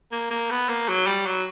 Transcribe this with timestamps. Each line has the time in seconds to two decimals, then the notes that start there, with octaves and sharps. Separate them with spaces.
0.12 A#3
0.30 A#3
0.50 B3
0.68 A#3
0.89 F#3
1.06 G3
1.26 F#3